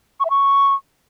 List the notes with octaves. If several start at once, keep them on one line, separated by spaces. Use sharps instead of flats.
C#6
E5
C#6